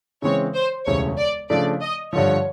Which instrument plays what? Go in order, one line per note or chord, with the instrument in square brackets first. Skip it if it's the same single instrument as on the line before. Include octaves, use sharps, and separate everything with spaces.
[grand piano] C#3 E3 G#3 C4 [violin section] C#5
[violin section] C5
[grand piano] E1 D2 C#3 E3 G3 [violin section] C#5
[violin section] D5
[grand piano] C#3 F3 A3 D4 [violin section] D5
[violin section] D#5
[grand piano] G2 D3 F3 [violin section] C#5